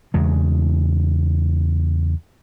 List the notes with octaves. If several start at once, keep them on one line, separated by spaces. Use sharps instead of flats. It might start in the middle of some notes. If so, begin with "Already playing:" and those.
E2 C#3 G#3